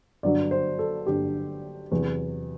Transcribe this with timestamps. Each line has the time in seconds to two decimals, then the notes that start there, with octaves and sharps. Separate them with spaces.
0.23 G1 G2 D3 F#3 D5
0.51 C5
0.79 A4
1.07 G1 G2 D3 F#3 G4
1.92 E2 C3 F#3